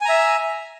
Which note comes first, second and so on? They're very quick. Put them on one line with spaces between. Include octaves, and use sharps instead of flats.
G#5 A#5 E5